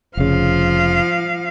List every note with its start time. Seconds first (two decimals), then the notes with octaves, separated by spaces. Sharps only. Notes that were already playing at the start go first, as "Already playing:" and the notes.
0.17 F1 C#3 F3 F5